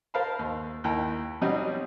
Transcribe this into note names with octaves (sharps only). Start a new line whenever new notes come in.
A#4 C5 F5 A5 B5
D#2
D#2 E4 G5 A#5
B2 F#3 G3 C4 C#4 D#4